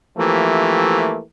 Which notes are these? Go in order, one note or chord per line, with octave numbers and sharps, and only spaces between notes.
E3 F3 A3 A#3 C4 G4